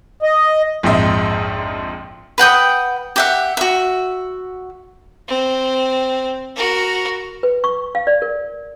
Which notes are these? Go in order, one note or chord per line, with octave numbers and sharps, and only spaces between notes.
D#5
A#1 F2 G#2 G#3 D#5 E5
B4 F#5 G5 D#6
G4 E5 F#5
F#4 E5
C4
F#4 A#4
B4
C#6
F5
D5
A#4